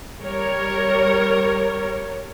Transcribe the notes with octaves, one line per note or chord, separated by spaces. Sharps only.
G3 A#4 C#5